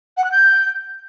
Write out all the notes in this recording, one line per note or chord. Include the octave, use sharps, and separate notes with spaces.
F#5
F#6
G6